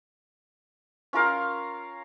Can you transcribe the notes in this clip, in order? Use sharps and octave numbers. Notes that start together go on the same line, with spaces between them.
C#4 F4 A#4 F5